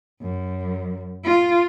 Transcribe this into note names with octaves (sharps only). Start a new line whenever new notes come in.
F#2
F4